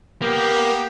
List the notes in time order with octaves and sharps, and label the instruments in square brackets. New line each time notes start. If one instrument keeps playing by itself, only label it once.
[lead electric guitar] A#3 [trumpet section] B3 G4